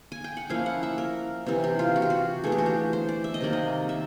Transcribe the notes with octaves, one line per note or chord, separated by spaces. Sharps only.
G#5
G5
F#5
F3 A#3 C#4 E4 F5
F#5
E5
A#4
C3 E3 G3 C4
G4
F4
F#4
G4
F#4
E3 A3 D4 G#4
G4
F#4
G4
C5
D5
E5
D#5
C3 D#3 F#3 A#3 D5
D#5
E5